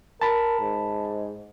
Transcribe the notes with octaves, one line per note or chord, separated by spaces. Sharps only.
A#4 A5 B5
G#2